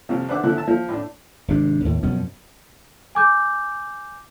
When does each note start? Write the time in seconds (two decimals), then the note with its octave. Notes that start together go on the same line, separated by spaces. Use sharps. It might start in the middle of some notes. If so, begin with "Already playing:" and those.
0.09 C2 F2 F3
0.29 D4 B4 C5 E5 F#5 D6
0.44 D3 F3 E4 F#6
0.56 E5 A5
0.68 F3
0.89 A2 D4
1.48 G#1 C3 D4
1.85 D#2 A2
2.03 F#2 B2 F3 C#4
3.15 G#5 D6 G6